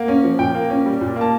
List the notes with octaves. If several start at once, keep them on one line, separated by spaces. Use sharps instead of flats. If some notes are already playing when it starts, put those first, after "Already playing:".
Already playing: A#3 F#5
C#4
F3
A#2 G5
A#3
C#4
G3
A#2
A#3
A5